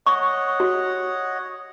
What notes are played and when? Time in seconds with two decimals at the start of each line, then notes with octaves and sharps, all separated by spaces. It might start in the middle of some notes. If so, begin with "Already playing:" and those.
0.06 C#5 D#5 F#5 C#6
0.60 F#4